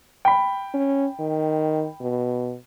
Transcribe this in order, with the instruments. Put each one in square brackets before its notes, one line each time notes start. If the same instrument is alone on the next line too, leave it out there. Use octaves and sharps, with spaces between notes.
[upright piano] G5 B5
[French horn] C#4
D#3
B2